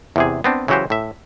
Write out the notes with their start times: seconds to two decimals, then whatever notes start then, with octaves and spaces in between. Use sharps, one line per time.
0.16 E2 C3 G#4
0.44 B3 C4 D4
0.68 C#3 E3 F#3 F#4 G4 C5
0.90 A2 E5